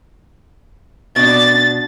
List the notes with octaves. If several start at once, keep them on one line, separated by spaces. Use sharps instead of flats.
B2 D4 A6